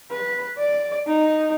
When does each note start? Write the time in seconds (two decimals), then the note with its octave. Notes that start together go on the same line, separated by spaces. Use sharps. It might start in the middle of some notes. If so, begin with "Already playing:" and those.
0.11 B4
0.58 D5
1.07 D#4